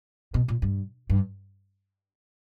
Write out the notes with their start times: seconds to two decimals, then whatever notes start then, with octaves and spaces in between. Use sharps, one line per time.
0.34 B2
0.48 A#2
0.62 G2
1.10 G2